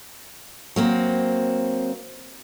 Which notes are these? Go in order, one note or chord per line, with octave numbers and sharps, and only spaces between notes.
F#3 A#3 C4